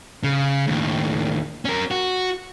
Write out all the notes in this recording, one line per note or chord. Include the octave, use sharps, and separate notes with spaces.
C#3
D#2 A2
C#4 A#4
F#4